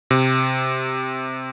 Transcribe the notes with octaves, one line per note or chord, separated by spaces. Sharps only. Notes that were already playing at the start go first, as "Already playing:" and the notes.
C3